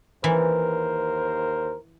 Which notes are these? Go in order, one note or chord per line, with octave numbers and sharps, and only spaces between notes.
D#2 E3 A#4 C5